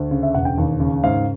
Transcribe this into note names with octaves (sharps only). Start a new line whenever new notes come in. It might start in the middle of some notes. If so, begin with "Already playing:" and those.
Already playing: D2
C#3
E5
E1 F#5
G5
D#2
C#3
G#2 F5